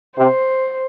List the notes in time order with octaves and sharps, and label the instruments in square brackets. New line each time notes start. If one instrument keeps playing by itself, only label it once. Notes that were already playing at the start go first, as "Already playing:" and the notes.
[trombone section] C3 [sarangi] C5